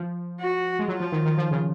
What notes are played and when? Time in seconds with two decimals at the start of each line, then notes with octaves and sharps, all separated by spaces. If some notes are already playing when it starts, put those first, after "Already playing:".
Already playing: F3
0.40 F#4
0.79 G#3
0.88 F#3 F4
1.00 F3
1.12 D#3
1.25 D#3
1.38 F3
1.51 C#3